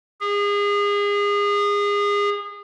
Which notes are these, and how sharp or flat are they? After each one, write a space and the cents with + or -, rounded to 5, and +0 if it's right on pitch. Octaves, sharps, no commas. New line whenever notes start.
G#4 -30